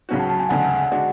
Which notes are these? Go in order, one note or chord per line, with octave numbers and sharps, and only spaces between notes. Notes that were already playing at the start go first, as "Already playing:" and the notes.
C#2 C#3 F#3 C#4 F#4
A5
A5
G#5
D2 C#3 G#3 F#5
G#3 D4 F#4